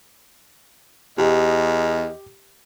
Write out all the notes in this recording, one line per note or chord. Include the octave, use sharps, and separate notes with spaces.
E2 G4 D#5